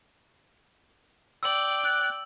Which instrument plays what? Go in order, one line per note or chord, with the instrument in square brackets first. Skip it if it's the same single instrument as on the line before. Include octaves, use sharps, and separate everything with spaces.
[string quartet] D5 G5 [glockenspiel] E6 F#7
[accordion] F#6